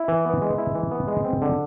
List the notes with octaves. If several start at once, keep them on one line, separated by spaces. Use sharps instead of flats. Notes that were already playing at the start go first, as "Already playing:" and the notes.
Already playing: E4
E3
B3
G#3
E4
E3
B3
G#3
C4
D3